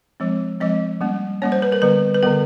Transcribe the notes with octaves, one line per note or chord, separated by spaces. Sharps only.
F3 G#3 C4
F3 G#3 C4 D#5
G3 A#3 C#4
G3 A#3 C#4 C#5
C5
B4
A#4
D3 G3 B3 B4
B4
D3 G3 B3 A#4